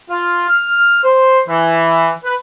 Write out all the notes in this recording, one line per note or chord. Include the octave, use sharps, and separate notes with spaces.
F4
F6
C5
E3
B4